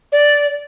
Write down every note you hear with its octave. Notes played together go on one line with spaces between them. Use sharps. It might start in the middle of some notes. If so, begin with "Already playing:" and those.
D5